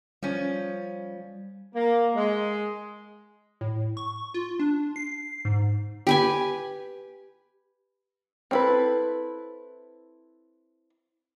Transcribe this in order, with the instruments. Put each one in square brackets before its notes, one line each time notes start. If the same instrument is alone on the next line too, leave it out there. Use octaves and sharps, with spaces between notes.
[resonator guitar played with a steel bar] F3 C#4 [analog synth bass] G3
[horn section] A#3
G#3
[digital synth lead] A2
C#6
F4
D4
C7
G#2
[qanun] G4 B4 G#5
[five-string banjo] C4 D4 E4 A4 B4